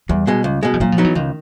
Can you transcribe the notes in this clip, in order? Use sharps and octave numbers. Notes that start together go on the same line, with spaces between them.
E2 G3
B2 G#3
C#2
B2 G#3
F3
A#2 F#3
F3
F#3 B3 D#4
E3
C#2 D#3